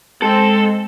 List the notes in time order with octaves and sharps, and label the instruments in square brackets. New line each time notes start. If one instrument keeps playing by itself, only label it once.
[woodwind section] G#3 [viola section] C4 [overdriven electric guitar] A4